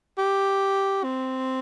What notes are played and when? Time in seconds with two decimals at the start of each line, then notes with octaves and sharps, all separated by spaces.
0.18 G4
1.04 C4